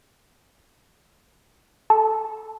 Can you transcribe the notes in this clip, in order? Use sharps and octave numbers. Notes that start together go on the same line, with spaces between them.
A4